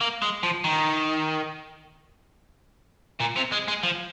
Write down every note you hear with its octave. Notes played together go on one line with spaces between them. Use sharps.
A#3
G#3
F3
D#3
A#2
C3
G#3
G#3
F3